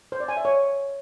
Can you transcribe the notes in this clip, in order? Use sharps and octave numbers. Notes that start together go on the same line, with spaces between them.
C5
D5
G#5
E5
C#5